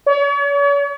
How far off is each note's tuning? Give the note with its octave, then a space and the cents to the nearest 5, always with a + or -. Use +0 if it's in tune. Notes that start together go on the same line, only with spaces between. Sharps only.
C#5 +40